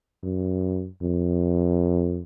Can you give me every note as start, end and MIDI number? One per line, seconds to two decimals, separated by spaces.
0.23 0.88 42
1.02 2.23 41